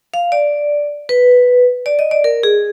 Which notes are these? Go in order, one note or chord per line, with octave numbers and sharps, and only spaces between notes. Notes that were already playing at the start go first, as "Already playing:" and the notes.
F5
D5
B4
D5
D#5
D5
A#4
G#4